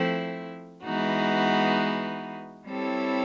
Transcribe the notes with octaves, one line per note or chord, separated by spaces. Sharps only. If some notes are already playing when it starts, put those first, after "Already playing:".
Already playing: F3 A3 C4 E4
E3 G#3 B3 D#4 F#4
G3 C4 E4 A4 C#5